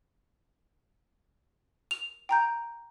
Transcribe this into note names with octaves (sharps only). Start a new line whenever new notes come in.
F7
G5 A#5 G6